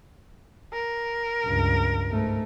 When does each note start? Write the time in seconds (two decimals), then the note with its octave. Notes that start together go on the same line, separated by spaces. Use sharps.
0.73 A#4
1.46 C#2 G2
2.10 G#2 A3